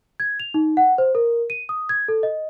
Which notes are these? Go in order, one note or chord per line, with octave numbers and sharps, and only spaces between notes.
G#6
F7
D#4
F#5
C5
A#4
D#7
D#6
G#6
A4
D#5